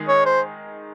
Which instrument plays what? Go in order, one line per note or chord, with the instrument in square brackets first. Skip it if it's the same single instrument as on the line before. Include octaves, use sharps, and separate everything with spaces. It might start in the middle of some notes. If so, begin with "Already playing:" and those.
Already playing: [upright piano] D#3 G#3 D#4 G#4
[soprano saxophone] C#5
C5